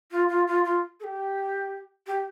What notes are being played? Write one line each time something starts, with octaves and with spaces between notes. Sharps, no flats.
F4
F4
F4
F4
A4
G4
G4